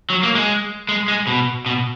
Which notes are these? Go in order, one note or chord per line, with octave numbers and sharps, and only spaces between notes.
F#3
A#3
G#3
G#3
G#3
B2
B2